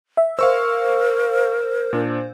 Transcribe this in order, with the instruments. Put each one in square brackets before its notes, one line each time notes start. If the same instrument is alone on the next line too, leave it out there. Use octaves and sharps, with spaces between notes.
[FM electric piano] E5
[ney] A#4 [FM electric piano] C5 [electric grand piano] F5 C#6 E6
[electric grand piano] A#2 D4